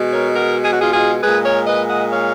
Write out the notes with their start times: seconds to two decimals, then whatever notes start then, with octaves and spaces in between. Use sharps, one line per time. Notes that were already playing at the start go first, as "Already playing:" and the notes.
Already playing: B2 G#3
0.13 A#4 C#5
0.35 F#4 A#4
0.64 G#4
0.72 F#4
0.81 F4 G#4
0.93 F4 G#4
1.22 A#2 G#3 G#4 B4
1.45 A#4 C#5
1.67 B4 D#5
1.88 D#5 F#5
2.11 C#5 F5